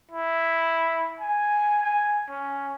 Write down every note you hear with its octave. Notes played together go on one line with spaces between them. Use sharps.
E4
G#5
G#5
C#4